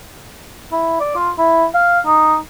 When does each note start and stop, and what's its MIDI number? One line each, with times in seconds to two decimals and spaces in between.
0.72 0.98 64
1.00 1.16 74
1.16 1.29 65
1.38 1.66 64
1.74 2.00 77
2.06 2.37 63